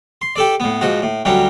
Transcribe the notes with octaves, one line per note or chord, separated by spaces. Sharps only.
C6
G4 A4 D5
A2 B3
G#2 F3 F#4
A2
D2 F#3 G3 C#4